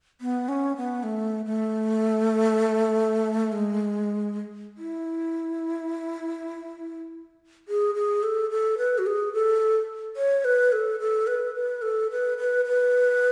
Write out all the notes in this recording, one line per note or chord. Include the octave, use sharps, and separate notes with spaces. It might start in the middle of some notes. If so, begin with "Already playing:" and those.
B3
C#4
B3
A3
A3
G#3
E4
G#4
G#4
A4
A4
B4
F#4
G#4
A4
C#5
B4
A4
A4
B4
B4
A4
B4
B4
B4